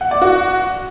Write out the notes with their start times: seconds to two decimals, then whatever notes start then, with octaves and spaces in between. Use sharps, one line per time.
0.01 F#5
0.11 D5
0.22 F#4